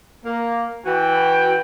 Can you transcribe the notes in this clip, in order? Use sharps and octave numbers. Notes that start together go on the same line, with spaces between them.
A#3
E3 F#4 G5